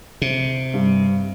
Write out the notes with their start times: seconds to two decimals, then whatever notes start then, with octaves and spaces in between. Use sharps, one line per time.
0.22 C3
0.74 G2